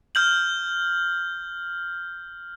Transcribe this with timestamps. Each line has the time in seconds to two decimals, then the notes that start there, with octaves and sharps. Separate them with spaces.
0.15 F6 G6 F#7